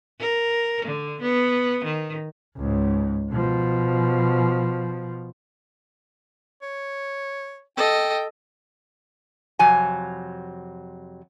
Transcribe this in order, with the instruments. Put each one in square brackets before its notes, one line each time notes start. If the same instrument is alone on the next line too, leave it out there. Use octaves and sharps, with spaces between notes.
[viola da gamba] A#4
D3
B3
D#3
[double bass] C#2 G#2
B2 F3
[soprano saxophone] C#5
[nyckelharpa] A4 D#5 [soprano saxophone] G5
[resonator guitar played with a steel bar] F2 C3 F#3 G#5